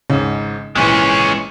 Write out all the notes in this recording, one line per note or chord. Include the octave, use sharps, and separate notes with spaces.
G#1 G#2 C#3
G#1 A#2 E3 G#3 C#4